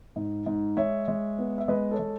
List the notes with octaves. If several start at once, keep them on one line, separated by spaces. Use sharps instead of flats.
G#2
G#2
G#3 C#5 E5
G#3
B3
E5
G#3 B4 D#5
A4 C#5
G#3